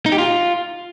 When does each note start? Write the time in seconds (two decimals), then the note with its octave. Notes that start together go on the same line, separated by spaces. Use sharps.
0.06 D#4
0.12 G4
0.18 F4